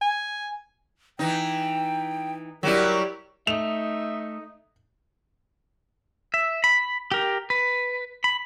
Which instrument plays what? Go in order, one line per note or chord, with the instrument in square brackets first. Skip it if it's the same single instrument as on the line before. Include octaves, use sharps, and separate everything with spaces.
[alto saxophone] G#5
[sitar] E3 D#4 [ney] G5
[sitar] F#3 G3 E4 [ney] A#4
[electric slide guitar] A3 [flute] D#4 [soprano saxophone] E5 [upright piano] F7
[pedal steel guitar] E5
B5
G4 A#4
B4
B5